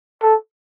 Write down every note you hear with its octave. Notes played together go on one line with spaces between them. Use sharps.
A4